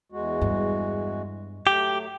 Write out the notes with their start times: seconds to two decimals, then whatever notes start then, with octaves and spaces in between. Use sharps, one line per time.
0.12 E2 G#3 F#4
0.41 G2
1.67 F#3 A3 G4